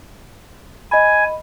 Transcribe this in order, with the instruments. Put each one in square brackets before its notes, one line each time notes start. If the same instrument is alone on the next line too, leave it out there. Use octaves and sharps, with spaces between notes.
[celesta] D#5 B5 [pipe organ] G#5